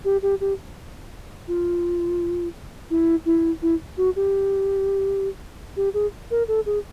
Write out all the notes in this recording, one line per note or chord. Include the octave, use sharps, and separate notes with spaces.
G4
G4
G4
F4
E4
E4
E4
F#4
G4
G4
G#4
A#4
A4
G#4